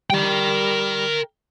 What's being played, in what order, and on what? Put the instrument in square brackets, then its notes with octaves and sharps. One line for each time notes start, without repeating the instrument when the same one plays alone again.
[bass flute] G3 [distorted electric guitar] A#4 G5